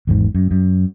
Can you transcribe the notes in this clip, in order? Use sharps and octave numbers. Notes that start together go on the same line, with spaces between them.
G#1 E2 G#2
F#2
F#2